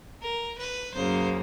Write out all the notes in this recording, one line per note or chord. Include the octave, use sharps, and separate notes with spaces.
A#4
B4
F#2 C#3 F#3 A#3 C5